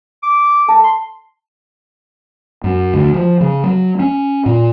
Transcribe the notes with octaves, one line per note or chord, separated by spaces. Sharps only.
D6
A4 A5
C6
F#2
D2
F3
C#3
F#3
C#4
A#2